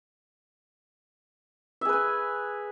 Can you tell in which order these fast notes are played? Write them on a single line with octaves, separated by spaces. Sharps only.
E5 G#4 B4 G#5